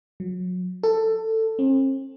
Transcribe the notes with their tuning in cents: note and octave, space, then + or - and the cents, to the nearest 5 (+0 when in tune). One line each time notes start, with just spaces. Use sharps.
F#3 -30
A4 +15
C4 +40